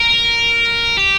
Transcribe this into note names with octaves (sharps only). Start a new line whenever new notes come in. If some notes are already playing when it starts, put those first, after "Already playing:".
Already playing: A#4
G4